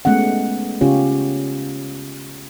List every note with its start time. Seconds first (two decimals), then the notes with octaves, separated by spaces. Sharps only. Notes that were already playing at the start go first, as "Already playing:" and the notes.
0.05 G#3 A3 B3 C#4 F#5
0.81 C#3 C#4 F4 G4 C#5